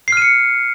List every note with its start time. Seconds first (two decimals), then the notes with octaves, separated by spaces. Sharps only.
0.08 C7
0.12 F6
0.17 D#7
0.22 C#7